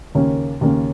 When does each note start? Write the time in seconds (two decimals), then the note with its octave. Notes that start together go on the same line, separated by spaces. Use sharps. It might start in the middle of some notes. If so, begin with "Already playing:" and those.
0.15 D#2 C#3 A#3 C#4
0.61 D#2 C#3 A#3 C#4